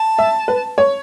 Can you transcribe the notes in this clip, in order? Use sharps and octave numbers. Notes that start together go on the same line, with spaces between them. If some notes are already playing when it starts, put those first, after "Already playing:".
Already playing: A5
E5
B4
C#5